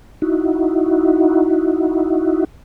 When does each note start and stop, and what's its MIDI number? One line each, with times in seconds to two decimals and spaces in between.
0.22 2.44 63
0.22 2.44 64
0.22 2.44 66